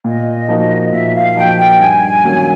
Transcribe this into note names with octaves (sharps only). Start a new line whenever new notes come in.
A#2 D#5
F3 A#3 D#4 F#4
A#2 E5
F5
F3 A#3 D#4 F#4 G5
G5
G2 G#5
D#3 F#3 A#3 C#4